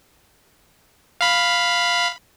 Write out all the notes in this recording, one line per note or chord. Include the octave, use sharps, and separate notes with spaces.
F5 B5